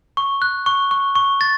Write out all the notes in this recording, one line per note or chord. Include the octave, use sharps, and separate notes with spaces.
C#6
F#6
C#6
C#6
C#6
A6